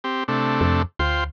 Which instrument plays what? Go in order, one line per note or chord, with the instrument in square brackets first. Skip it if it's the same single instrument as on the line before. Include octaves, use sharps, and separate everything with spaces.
[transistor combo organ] C4 G4
C3 A3 D4
[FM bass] F2
[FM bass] D2 [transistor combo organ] F4 C5 G5